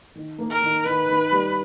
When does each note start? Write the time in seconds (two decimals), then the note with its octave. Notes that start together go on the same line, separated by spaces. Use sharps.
0.15 D#3
0.38 A#3
0.50 A#4
0.62 D#3
0.85 D#3 B4
1.09 D#3
1.32 G3